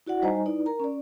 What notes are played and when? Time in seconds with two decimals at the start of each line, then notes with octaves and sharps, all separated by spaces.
0.06 E4 F#4 D5 F#5
0.22 G3 D#4 C5 D#5 G#5 A#5
0.46 D#4 E4 B4 D5
0.66 A#4 A#5
0.80 C#4 D5